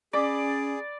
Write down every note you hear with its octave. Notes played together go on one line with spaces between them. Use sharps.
C#4 G#4 D5 B5 D6